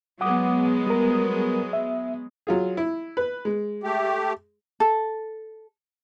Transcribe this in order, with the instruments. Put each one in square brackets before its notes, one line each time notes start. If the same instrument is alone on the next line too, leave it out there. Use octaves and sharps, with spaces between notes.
[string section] F#3 G#3 B3 [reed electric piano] F#5 D6 D#6
[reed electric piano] G3 A#4
E5
[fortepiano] F#3 F4 G#4
E4
B4
G#3
[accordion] A3 G4
[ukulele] A4